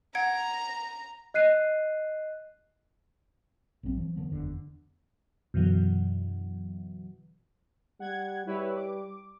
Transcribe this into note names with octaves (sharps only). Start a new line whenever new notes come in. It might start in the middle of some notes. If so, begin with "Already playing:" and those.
F#5 A#5 G#6 D7
D#5 F#6 C7 D#7
A#1 G2 F#3 C4
E3 F3
D3 F3 B3
F#1 E2 D3
F#2 B2 D3 E3 F#3
G3 F#5 G#6
G3 E4 B4 C#5
D6